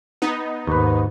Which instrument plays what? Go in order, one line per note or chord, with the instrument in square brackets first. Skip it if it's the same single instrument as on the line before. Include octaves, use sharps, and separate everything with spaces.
[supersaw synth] B3 D#4
[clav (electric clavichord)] D#2 B4 [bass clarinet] G#2